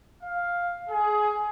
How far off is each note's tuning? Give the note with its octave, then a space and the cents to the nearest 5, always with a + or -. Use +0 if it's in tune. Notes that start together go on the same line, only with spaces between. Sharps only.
F5 +5
G#4 +20